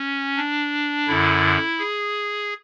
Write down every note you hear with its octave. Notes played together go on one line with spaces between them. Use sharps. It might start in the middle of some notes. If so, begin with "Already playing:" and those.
Already playing: C#4
D4
F#2 D3 E4
G#4